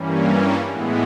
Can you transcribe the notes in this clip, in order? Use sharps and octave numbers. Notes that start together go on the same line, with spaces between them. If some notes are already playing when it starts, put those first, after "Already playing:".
Already playing: G2 E3 G3 A#3 C#4
A2 E3 G#3 B3